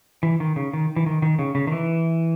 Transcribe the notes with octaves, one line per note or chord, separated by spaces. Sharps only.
E3
D#3
C#3
D#3
E3
D#3
D#3
C#3
C#3
D#3
E3